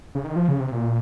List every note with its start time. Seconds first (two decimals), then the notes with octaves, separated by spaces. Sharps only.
0.15 C#3
0.24 D#3
0.36 F3
0.48 C#3
0.60 C3
0.72 A#2